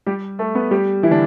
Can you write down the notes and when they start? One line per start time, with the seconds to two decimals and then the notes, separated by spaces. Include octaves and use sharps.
0.06 G3 G4
0.39 A3 A4
0.55 B3 B4
0.71 G3 G4
1.03 E3 E4
1.11 D3 D4